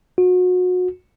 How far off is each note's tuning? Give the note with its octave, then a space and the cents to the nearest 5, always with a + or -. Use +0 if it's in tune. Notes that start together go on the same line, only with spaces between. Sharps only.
F#4 -30